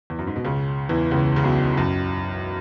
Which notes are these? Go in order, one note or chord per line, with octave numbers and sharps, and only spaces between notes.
E2
F#2
G#2
B2
C#2 C#3
E2 E3
C#2 C#3
C#3
B1 B2
F#2